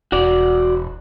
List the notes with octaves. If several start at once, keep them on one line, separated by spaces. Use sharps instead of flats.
E1 F#4 D5